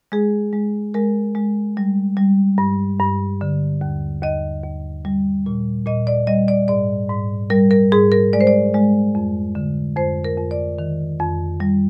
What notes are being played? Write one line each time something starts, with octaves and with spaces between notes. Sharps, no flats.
G#3 G#4
G#3
G#3 A#4
G#3
G3
G3
G2
G2
D3
D#2
D#2 D#5
D#2
G3
A#2
A#2 D#5
D5
G3 D#5
D5
G#2 D5
G#2
G3 A#4
A#4
G#2 G#4
A#4
G#3 D5
C5
D5
G#3
F2
D3
F2 C5
A#4
F2
D5
D#3
F2
G3